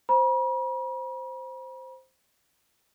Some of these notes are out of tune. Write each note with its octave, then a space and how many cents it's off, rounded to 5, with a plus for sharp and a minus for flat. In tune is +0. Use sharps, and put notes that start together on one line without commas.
C5 +0 B5 -45